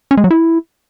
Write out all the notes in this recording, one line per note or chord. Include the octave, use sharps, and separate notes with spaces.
C#4
G#3
F#3
E4